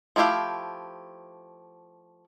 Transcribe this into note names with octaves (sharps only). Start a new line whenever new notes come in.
F3 A3 E4 G4 F5